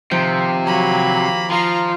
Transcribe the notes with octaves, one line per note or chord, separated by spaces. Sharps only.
C3 D#3 F3 G6
F#3 A#3 B5
F3 F4 A#5 C6